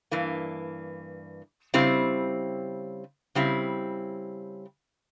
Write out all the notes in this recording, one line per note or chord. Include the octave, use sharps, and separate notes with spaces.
G2 E3 A#3
C#3 G3 C4 E4
C#3 G3 C4 E4